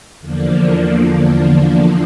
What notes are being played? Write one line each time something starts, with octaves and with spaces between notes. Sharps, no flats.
E2 D3 F3 A#3 D4